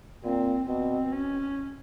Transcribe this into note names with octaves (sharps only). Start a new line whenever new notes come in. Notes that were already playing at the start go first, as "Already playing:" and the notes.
A#2 C4
B2 C4
C#4